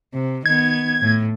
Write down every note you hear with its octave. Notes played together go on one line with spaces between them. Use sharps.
C3
D#3 B3 G#6
A2